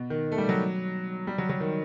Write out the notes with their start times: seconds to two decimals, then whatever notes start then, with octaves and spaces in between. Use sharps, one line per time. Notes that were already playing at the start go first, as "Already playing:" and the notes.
Already playing: B2
0.10 D#3
0.32 A3
0.38 G3
0.49 F#3
1.27 G3
1.38 F#3
1.49 F#3
1.60 D#3